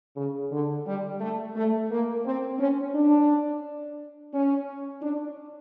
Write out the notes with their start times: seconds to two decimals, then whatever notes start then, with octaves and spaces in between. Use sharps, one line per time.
0.17 C#3
0.52 D3
0.87 G3
1.21 A3
1.55 A3
1.91 A#3
2.25 C4
2.59 C#4
2.95 D4
4.34 C#4
5.02 D4